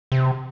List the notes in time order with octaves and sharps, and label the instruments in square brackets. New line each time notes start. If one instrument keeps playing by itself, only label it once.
[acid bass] C3